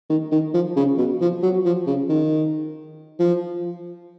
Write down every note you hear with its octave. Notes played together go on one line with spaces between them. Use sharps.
D#3
D#3
F3
C#3
B2
F3
F#3
F3
C#3
D#3
F3